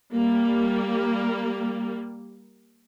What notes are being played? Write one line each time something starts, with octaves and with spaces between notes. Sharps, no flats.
G3 A#3